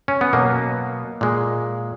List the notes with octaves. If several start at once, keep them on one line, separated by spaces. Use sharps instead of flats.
C#4
B3
B2 F#3 A#3
A#2 G#3